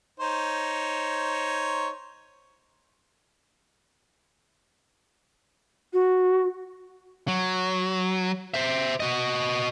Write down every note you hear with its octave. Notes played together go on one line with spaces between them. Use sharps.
D#4 C5 C#5
F#4
F#3
C5 E5
F#4 D#5